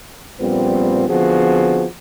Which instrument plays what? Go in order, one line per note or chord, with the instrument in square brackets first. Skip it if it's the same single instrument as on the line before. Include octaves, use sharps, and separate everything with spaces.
[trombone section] A#1 A#2 G3 B3 C4
D3 F3 B3 C4 F#4 G#4